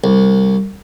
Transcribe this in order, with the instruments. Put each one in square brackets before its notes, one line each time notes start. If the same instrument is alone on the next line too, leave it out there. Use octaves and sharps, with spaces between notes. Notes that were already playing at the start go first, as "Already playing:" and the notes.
[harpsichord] C2